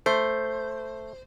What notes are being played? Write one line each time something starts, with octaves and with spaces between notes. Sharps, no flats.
A3 C5